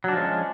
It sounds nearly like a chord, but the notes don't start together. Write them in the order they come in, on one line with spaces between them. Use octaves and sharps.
F#3 D4 F3 G#3 C#4